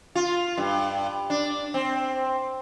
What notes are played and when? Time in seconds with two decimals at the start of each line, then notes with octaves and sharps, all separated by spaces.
0.15 F4
0.58 G2
1.30 D4
1.74 C4